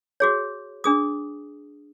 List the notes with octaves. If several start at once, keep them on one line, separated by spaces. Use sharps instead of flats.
F#4 G#4 C#5
D4 G#4 D#6